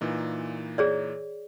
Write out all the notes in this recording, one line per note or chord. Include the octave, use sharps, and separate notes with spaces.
A#2 E3 D#4
G#4 C#5 D5